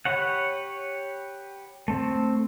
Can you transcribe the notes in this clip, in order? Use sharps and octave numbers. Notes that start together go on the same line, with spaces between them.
G4 B4 C#5 F#5
A3 C4